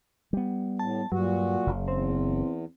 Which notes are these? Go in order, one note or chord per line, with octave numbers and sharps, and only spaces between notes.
G3 B3
A2 A5
G2 A#2 F#3 F#4
F#1 C#3
E2 C4